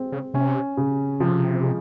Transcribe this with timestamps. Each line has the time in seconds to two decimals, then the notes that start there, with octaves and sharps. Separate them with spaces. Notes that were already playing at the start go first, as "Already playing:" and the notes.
Already playing: G#3 C4
0.12 C#3
0.34 C3 C#4
0.77 C#3
1.20 C3 F3
1.63 G#3